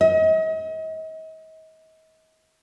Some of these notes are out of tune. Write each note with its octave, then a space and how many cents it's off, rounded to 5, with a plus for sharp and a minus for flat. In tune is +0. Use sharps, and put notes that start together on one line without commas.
D#5 +40